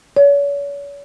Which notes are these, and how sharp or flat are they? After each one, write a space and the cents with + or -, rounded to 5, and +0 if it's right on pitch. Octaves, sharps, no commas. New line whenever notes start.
C#5 +40